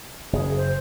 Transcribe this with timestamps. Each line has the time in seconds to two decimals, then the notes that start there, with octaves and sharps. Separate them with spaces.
0.33 F#1 G#4
0.57 C5